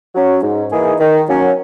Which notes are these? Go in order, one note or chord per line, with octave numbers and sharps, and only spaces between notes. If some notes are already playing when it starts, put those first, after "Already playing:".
F#3 C#4
G#2
E3 A#3 D#4 G#4
D#3
F#3 A#3 C#4